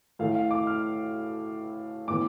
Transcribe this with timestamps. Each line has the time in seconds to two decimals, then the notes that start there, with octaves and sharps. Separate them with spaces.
0.19 A2 E3 A3 F5
0.35 F5
0.51 D6
0.67 F6
2.08 A2 E3 B3 D6